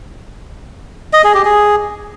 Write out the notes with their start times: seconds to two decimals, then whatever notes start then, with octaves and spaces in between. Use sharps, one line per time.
1.13 D#5
1.24 G#4
1.34 G4
1.45 G#4